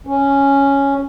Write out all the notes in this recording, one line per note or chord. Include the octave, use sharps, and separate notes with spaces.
C#4